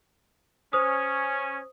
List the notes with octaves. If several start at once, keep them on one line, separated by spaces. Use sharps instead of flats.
C#4 C5 G#5 D#6